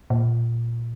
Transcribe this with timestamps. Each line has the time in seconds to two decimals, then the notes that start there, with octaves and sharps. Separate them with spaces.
0.10 A#2